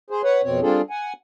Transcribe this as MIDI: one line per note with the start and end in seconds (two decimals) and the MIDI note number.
0.10 0.22 68
0.10 0.22 72
0.23 0.42 71
0.23 0.42 73
0.23 0.42 78
0.44 0.60 41
0.44 0.60 47
0.44 0.60 60
0.44 0.60 73
0.62 0.82 55
0.62 0.82 60
0.62 0.82 62
0.62 0.82 65
0.62 0.82 68
0.62 0.82 69
0.90 1.13 78
0.90 1.13 80